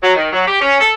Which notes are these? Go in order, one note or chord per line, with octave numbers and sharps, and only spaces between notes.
F#3
D#3
F#3
G4
C#4
A4